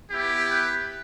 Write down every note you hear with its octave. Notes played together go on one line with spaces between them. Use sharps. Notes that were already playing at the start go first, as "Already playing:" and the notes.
B3 E4 G4
B4